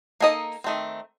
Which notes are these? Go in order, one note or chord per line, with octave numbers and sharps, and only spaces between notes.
A#3 D#4 A4 D#5
D#3 A3 C4